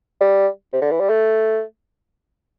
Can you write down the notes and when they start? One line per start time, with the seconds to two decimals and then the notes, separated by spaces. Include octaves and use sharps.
0.21 G3
0.73 C3
0.82 D3
0.91 E3
1.00 G3
1.09 A3